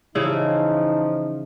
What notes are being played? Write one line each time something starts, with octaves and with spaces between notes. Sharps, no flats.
C#3 E3 F3 D#4 E4